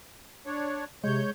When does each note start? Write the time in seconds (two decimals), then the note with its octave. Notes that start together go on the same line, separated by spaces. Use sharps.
0.46 D4 C#5
1.04 C3 G#3 C#5 G6